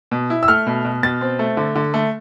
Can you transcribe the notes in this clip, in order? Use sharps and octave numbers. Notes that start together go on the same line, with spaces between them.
B2
E4
E6
A3 F6
B2
B2
B2 A6
C4
A3
D3
D3
A3